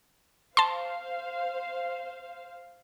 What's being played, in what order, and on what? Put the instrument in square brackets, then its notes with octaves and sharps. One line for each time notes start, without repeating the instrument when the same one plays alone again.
[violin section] C5 F5 [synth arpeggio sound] A5 C6